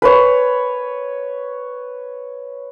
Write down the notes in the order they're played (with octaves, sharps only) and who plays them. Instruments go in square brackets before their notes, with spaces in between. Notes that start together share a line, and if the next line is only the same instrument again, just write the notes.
[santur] B4 C#5